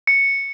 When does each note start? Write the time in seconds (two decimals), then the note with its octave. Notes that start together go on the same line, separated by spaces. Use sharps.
0.07 C#7